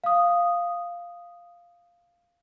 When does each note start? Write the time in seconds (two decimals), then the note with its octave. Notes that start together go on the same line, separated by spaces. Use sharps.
0.04 F5 D#6